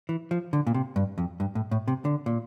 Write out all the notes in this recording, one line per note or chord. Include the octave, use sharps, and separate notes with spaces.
E3
F3
D3
A#2
C3
G2
F2
G2
A2
A2
C3
D3
A#2